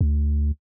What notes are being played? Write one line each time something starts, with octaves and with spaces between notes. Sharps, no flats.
D2